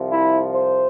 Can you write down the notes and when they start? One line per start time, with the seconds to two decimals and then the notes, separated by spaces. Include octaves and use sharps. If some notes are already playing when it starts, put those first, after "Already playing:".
Already playing: C2 C3 F3
0.11 E4
0.54 C5